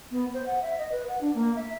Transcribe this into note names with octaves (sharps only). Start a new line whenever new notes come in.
B3
C5
F#5
E5
D#5
B4
F#5
D4
A#3
E5